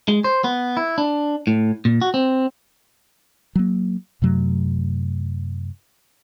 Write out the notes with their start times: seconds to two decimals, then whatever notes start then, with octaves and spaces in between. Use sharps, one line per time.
0.08 G#3
0.24 C5
0.44 B3
0.77 E4
0.98 D4
1.47 A2
1.85 A#2
2.02 F#4
2.14 C4
3.56 F#3 A#3
4.22 F#2 C3 F#3 A3